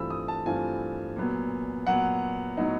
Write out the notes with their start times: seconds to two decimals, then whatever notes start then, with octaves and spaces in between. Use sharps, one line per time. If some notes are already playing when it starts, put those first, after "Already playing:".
Already playing: G2 E3 A3 C4 F4 B5 E6
0.10 D#6
0.28 A5
0.46 G2 E3 A3 C4 F4 G#5
1.16 A#2 F#3 B3
1.87 A#2 F#3 B3 F#5
2.57 A2 F#3 B3 D#4